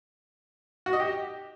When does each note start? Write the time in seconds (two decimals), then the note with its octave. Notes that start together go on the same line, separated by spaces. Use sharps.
0.86 F#4
0.93 D#5
1.00 G4